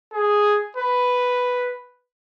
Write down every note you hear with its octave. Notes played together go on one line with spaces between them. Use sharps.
G#4
B4